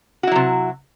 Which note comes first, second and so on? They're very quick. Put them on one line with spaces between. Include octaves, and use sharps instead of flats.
F#4 E4 F#3 C3